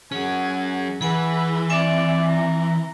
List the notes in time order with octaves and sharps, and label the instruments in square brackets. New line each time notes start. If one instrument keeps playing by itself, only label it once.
[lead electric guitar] F#3 C#4 [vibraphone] G#4 [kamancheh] F#5 G#5
[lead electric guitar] E3 [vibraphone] G#4 F#5 G#5 [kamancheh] B4 E6
[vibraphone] C4 E5 G#5 [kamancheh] D5
[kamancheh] A#5